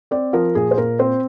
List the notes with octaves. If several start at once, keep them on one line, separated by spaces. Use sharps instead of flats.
C4 D5
F3 A#4
A#2 G#4
C5
A#2 A#4
C4 C5